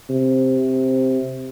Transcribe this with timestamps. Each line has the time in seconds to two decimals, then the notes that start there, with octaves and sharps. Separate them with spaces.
0.10 C3